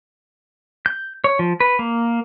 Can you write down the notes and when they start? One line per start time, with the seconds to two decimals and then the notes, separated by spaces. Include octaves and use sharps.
0.86 G6
1.24 C#5
1.39 F3
1.60 B4
1.79 A#3